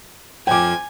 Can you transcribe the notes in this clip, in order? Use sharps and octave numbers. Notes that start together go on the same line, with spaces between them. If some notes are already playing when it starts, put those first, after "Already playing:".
F2 F3 G5 G#5 D6